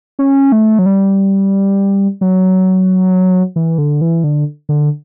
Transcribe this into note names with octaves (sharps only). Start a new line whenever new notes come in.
C#4
A3
F#3
G3
F#3
E3
D3
E3
D3
D3